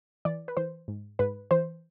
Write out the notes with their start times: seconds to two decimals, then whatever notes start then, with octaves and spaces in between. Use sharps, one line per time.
0.25 E3 D5
0.48 B4
0.57 E3 C5
0.88 G#2
1.19 G#2 B4
1.51 E3 C5